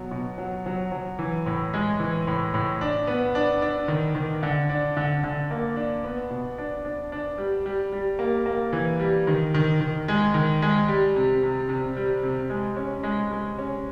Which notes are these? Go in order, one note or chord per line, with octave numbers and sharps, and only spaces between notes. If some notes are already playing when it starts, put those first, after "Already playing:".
Already playing: B2 F#3
B2
F#3
F#3
F#3
E3
A2
G#3
E3
A2
A2
D4
B3
D4
D4
D#3
D#3
D3
D4
D3
D3
A#3
D4
B3
B2
D4
D4
D4
G3
G3
G3
A#3
A#3
E3
G3
D#3
D#3
D#3
G#3
D#3
G#3
G3
C3
C3
C3
G3
C3
G#3
C#4
G#3
G#3
C#4